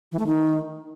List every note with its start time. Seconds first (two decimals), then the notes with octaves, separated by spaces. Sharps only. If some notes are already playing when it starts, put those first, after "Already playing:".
0.12 E3
0.19 A3
0.26 D#3